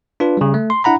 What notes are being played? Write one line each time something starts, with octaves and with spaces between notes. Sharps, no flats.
D4 F4 B4
C#3 G3
A3
C6
D4 E4 F#5 A#5 B5